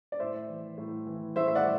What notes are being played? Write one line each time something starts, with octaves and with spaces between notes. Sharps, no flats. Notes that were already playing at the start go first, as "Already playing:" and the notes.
D5
A2 C5 E5
E3
A2
E3
A2 C5 E5
E5
D5 F#5